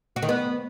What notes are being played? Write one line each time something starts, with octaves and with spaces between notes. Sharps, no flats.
F#4
D#3
B3